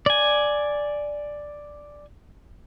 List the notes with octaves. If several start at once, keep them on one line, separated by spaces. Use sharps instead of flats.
D5 G#5